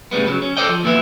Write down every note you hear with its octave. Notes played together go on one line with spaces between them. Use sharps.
A2 C#3 G3 G#3 B3
C#3 F3 F#3
C#4
A4 C5 D5 D#5 G5
F3
A#2 D#3 E3 B3 E4